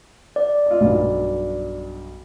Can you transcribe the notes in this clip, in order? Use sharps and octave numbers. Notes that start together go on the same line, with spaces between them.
D5
F4 D#5
B1 G2 F#3